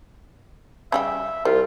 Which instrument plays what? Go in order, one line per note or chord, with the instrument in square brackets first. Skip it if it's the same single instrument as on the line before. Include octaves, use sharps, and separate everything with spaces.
[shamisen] C#3 G3 G4 [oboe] E5
[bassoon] C2 [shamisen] G3 [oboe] F4